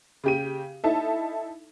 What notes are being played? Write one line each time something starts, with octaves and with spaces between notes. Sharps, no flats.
C#3 G4 D#7
D#4 E4 A4 E5